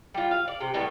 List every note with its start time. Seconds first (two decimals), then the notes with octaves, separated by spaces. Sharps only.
0.14 G3 F4
0.31 F5
0.48 D5
0.61 C3
0.74 A2 G3 A3 B3